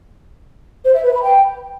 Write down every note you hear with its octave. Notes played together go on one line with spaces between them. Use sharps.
C5
E5
B4
B5
G5